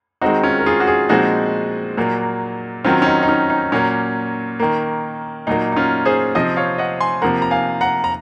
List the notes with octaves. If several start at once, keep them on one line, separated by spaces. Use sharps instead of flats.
D#3 G#3 C4 D#4 F#4
C#4 F4
A#4
F4 G#4
F#4
F4 G#4
A#2 F3 G#3 C4 D#4 F#4
A#2 F#3 A#3
D#3 F#3 C4 C#4 F4
C#4
D#4
D#4
C#4
D#4
A#2 F#3 A#3 C#4
D#3 A#3
A#2 F#3 A#3 D#4
D#4
C#4 F4
G#4 C5
C3 F3 C4 C5 D#5
C#5 F5
D#5 F#5
G#5 C6
C3 F3 A#3 F#5 A#5
A#5
F5 G#5
F#5 A#5
A#5